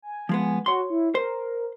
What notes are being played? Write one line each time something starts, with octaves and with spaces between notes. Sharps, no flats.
G#5
F3 G#3 B3
F#4 C#5 C6
E4
A#4 C5